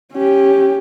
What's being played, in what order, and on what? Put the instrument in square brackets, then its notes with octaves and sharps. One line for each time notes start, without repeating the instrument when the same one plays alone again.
[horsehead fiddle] C#4 G4